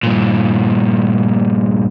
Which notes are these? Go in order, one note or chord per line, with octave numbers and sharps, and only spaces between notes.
G2 A#2